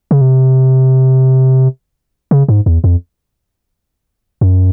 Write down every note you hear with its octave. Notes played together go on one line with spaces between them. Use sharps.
C#3
C3
C#3
G#2
E2
F2
F#2